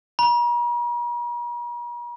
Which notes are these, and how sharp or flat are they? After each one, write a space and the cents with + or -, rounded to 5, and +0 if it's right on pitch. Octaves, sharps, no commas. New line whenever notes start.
A#5 +45